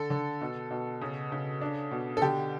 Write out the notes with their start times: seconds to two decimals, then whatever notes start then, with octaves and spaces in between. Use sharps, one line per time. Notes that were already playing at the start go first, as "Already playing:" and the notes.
Already playing: D3 A4
0.10 D3
0.41 B2
0.71 B2
1.01 C#3
1.32 C#3
1.61 D4
1.91 B2
2.17 A4
2.22 D3 G4